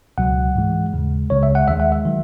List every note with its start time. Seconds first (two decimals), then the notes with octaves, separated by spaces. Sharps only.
0.18 C#2 B2 F#3 F#5
0.55 G#2 E3 G#3
0.93 D#2 C#3 G#3
1.30 C#2 C#3 G#3 C#5
1.43 E5
1.55 F#5
1.68 D#2 D#3 G#3 E5
1.80 F#5
1.92 E5
2.06 D#3 F#3